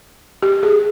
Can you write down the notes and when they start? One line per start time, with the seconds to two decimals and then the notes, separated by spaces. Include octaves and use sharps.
0.42 G4
0.63 G#4